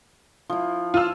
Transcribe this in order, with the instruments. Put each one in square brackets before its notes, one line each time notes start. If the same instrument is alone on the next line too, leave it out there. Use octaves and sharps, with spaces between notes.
[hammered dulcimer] F3 E4
[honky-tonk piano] F4 E6